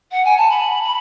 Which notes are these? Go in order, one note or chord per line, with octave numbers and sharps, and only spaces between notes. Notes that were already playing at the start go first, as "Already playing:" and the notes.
F#5
G#5
A5
B5
B5